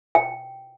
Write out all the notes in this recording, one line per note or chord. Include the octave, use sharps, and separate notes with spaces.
G5